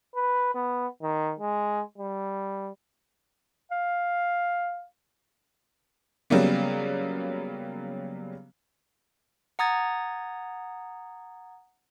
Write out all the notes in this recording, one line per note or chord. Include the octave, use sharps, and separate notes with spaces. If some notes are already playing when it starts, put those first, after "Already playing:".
B4
B3
D#3
G#3
G3
F5
C#3 F#3 G3 A#3 B3
F#5 A#5 D#6 G#6 A6